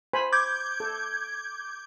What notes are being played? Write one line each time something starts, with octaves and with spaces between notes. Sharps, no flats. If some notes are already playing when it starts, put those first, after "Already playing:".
C5 G#5 B5
D6 G6 G#6
A4